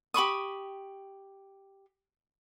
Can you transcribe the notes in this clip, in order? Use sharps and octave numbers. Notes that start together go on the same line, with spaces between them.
G4 B5 C#6 D#6